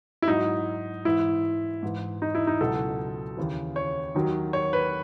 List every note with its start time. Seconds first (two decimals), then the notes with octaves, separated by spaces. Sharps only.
0.22 E4
0.28 G#2 F#3 D#4
1.05 G#2 E3 E4
1.83 G#2 E3
2.22 D#4
2.35 E4
2.47 D#4
2.61 C#2 B2 F#3 A4
3.37 D#2 C#3 E3
3.76 C#5
4.15 D#2 D#3 F#3
4.53 C#5
4.73 B4